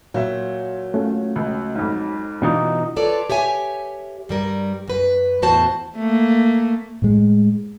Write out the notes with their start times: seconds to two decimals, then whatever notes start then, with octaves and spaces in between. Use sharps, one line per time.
0.14 A#2 F#3 E5
0.94 A3 C#4 F4
1.36 C#2
1.75 F2 G#2
2.42 B2 E3 D4 D#4 F4
2.96 F4 A4 B4 C#5 D5
3.30 G4 C#5 E5 G#5
4.29 G2 G3 A#4
4.88 F#2 B4
5.42 E2 A2 F#4 C5 A5
5.96 A3 A#3
7.02 A2 G#3